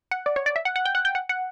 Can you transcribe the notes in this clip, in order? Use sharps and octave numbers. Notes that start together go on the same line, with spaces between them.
F#5
D5
C#5
D5
E5
F#5
F#5
G5
F#5
G5
F#5
F#5